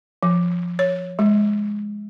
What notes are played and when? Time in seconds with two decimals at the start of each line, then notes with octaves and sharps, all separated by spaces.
0.23 F3
0.79 C#5
1.19 G#3